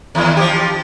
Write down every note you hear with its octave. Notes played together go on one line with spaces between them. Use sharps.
D#2 E3
F3 G4